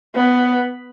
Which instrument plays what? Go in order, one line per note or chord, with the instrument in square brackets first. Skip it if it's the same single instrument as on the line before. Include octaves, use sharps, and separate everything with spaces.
[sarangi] B3